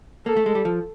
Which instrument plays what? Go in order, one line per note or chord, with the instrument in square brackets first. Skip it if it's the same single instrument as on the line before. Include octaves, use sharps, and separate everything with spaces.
[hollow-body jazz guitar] A#3 [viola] A4
[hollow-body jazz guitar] A3
G#3
G3
F3